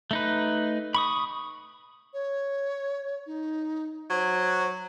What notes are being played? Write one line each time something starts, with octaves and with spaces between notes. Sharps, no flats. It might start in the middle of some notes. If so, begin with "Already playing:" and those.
A3 D#4 B4
B5 C#6 D#6
C#5
D#4
F#3 C5